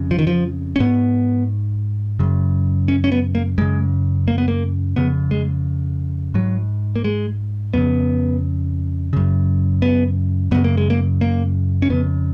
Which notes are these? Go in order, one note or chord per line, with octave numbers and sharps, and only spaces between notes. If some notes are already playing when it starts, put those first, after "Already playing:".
Already playing: F2 C#3
F3
D#3
F3
C#4
G#2 B3
F#2 C#3
C#4
C#4
B3
A#3
F#2 C#3 G#3
A#3
B3
A#3
F2 C#3 B3
G#3
G#2 F#3
A#3
G#3
F2 C#3 B3
F#2 C#3
B3
F#2 C#3 B3
A#3
G#3
A#3
A#3
C#4
F2 C#3 B3